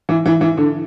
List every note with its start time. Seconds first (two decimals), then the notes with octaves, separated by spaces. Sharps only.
0.09 E3
0.26 E3
0.41 E3
0.57 D3